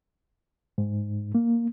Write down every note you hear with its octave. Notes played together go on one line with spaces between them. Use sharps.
G#2
A#3